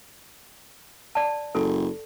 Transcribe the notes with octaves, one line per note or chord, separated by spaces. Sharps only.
D5 A5
F#1 A4